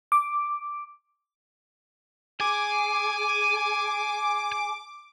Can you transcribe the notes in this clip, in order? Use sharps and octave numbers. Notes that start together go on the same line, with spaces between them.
D6
G#4 G#5 D6